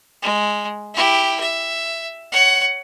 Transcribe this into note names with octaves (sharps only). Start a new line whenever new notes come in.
G#3
E4 G4
E5
C#5 F#5